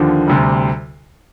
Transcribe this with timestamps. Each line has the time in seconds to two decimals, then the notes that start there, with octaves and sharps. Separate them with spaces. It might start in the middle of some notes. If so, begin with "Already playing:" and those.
Already playing: D#2 D3 F3
0.28 D2 C3 G3